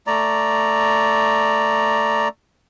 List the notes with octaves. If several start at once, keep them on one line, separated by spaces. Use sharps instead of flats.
A3 D5 A#5